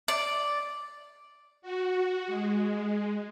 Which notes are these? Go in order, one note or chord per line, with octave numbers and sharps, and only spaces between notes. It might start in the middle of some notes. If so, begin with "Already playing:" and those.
D5
F#4
G#3